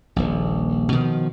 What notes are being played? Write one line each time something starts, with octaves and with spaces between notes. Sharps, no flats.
D#1 A#1
B2 D#3 F3